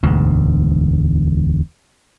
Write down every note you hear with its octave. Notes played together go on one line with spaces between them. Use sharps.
E1 D2 G#2